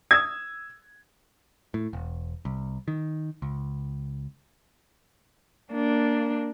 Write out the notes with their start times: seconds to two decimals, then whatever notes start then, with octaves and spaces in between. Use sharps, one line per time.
0.11 D#6 E6 G#6
1.74 A2
1.93 E1
2.45 C2
2.88 D#3
3.42 C#2
5.72 A#3 D4